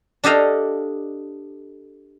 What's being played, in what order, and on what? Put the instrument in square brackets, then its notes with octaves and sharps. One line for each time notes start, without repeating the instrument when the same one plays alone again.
[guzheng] D4 G4 A4 D#5 F5